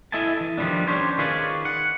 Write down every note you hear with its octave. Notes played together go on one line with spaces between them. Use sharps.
E4 A4 D#5 E5 G#5 A5
E3
D#3 F3 G3 B3 C4 D4
C#4 D4 G4 C5 C#5
D#3 F4 G#4 B4 C#5 D5
F#5